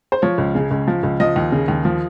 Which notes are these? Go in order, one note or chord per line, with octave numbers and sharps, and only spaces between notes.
C5
F3 C#5
C#2
C#3
C#2
F3
C#2
F3 D#5
D#2
C#3
D#2
F3